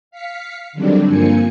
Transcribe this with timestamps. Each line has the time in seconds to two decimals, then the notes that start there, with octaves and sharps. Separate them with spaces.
0.11 F5 B6 C#7
0.73 D3 D#3 F#3 G3 C4 D4
1.06 G2 F3 A#3 C4 G#5 C#7